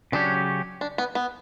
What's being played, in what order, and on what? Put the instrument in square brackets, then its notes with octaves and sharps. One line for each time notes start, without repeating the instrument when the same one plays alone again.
[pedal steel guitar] C#3 F#3 C#4 G4 C#5 [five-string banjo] D4
[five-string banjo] D4
B3
B3